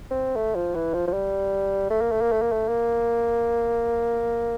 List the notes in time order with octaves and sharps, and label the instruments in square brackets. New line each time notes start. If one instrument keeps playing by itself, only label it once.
[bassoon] C4
A3
F3
E3
F3
F3
G3
A3
A#3
A3
A#3
A3
A#3
A3
A#3